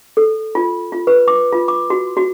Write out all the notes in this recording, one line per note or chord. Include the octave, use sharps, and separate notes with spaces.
A4
F4
F4
B4
D6
F4
D6
F#4
F#4